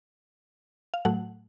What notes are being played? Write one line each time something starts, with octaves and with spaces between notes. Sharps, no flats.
F5
A2 F#3 A3 F#5